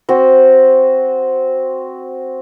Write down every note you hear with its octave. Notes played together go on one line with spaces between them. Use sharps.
C4 F#4